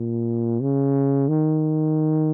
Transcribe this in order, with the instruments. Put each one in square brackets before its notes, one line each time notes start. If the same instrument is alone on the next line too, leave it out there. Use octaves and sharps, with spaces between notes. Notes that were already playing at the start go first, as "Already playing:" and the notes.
Already playing: [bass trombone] A#2
C#3
D#3